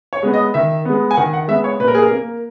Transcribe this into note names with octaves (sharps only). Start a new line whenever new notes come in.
C#5
G#3 B3
D#5
D#3 E5
G#3 B3
G#5
D#3 F#5
F#5
G#3 B3 E5
C#5
A#2 B4
A#4
G#4
A#4
A#3